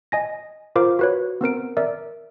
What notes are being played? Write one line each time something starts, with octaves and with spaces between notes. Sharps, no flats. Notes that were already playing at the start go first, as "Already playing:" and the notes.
D#5 G#5 A#6
F4 A#4 C5 F5 D6
F#4 B4 C#5
B3 C4 A#4 D7
A#4 D5 E5